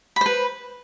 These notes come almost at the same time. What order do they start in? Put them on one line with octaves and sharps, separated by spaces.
B5 C5 B4